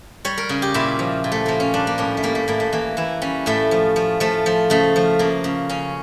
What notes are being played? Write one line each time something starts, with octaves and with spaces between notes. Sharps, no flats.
G3 C#5
A#4
C#3
G4
A#2 E4
F3
A#2
A3
F3 A#3
C#4
G3 D4
A#3
A2 C#4
A3
G3 A#3
A3
A2 A#3
A3
E3 A#3
E3 E4
G3 C#4
A2 A3
F3
F3
F3 A3
F3
C#3 A3
F3
C#3 A#3
C#3
C#3 C#4